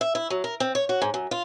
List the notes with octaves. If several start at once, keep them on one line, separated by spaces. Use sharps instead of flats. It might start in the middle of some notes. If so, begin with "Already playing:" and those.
E5
E4
F#3
A#4
C4
C#5
F#4
G#2
F#2
F4